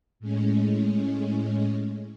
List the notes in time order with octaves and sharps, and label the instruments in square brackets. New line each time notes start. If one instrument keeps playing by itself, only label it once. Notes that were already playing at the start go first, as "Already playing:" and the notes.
[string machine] A2 G#3 C#4